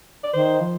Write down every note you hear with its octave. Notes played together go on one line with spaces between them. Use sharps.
D5
D#3 C5
F3